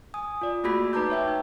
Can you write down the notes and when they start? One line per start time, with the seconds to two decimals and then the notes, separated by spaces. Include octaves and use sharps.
0.14 G#5 D#6
0.41 F4 D5
0.64 A3 A#3 F#4 G#4 B5 B6
0.93 D#4 B4 A5 A#5 D6 G6
1.10 C#5 E5 G5
1.27 D#4